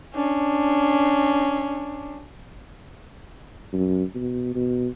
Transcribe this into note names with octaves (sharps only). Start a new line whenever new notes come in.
C#4 D4
F#2
B2
B2